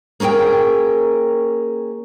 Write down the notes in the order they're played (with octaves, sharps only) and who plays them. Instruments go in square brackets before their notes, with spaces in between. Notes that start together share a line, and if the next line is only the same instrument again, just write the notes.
[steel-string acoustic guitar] A#3 C#4 G#4 A#4 G5